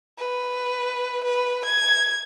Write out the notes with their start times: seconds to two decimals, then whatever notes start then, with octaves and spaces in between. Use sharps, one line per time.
0.18 B4
1.24 B4
1.65 G#6